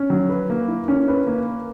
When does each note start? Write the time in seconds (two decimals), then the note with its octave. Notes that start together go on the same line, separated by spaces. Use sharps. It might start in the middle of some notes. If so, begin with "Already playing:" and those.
Already playing: C#4
0.10 F#3
0.29 B4
0.50 A#3
0.68 E4
0.88 C#4
1.08 B4
1.27 A#3